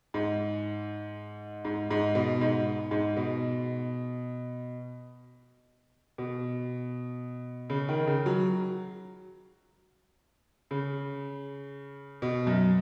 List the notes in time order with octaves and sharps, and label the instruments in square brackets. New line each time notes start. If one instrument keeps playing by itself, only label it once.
[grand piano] G#2
G#2
G#2
B2
G#2
G#2
B2
B2
C#3
D#3
C#3
F#3
C#3
B2
F#2